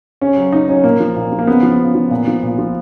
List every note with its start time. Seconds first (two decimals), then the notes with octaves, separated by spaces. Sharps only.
0.21 C#3 C#4
0.37 F#3
0.52 C#3 D#4
0.69 F#3 C#4
0.84 A#2 A#3
1.00 F3
1.16 A#2
1.32 F3
1.39 A#3
1.47 C#3 B3
1.63 F3
1.79 C#3
1.95 F3
2.11 A#2
2.27 F3
2.43 A#2
2.59 F3